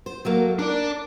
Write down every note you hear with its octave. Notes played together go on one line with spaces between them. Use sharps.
C5
F#3 A3 A#3
D4 A#4 D5